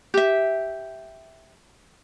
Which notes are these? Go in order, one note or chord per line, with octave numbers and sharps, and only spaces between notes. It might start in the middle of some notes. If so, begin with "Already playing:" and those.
G4 E5